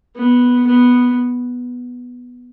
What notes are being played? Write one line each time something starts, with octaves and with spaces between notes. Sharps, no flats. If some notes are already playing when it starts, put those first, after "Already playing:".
B3
B3